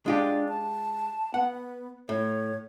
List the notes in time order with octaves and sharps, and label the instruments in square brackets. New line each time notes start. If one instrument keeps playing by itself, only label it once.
[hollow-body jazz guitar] G#3 F4 G4 [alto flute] D4
[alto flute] A5
[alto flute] B3 [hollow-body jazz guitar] F#5
[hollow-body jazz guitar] A2 [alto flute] C#5